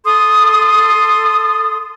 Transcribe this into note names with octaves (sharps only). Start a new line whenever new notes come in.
A4 C6 D#6